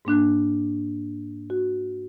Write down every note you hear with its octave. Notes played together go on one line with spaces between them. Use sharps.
G#2 A#3 D4 F#6
F#4